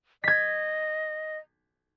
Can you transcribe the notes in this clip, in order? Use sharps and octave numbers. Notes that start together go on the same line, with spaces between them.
D#5 G#6 B6